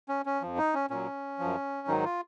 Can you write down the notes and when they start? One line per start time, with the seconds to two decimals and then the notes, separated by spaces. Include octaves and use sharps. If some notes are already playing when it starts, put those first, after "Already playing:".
0.09 C#4
0.26 C#4
0.42 F2 F3
0.58 D#4
0.74 C#4
0.90 A#2 F#3 C#4
1.39 F#2 F3
1.88 G#2 D#3 F#3 D#4
2.04 F4